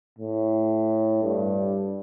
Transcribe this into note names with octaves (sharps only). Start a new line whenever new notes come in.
A2
G2